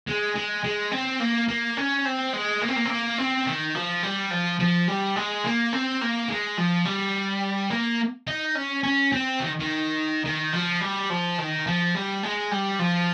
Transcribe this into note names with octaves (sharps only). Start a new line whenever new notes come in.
G#3
G#3
G#3
C4
A#3
A#3
C#4
C4
G#3
A#3
C4
A#3
C4
A#3
C4
D#3
F3
G3
F3
F3
G3
G#3
A#3
C4
A#3
G#3
F3
G3
A#3
D#4
C#4
C#4
C4
D#3
D#3
D#3
F3
G3
F3
D#3
F3
G3
G#3
G3
F3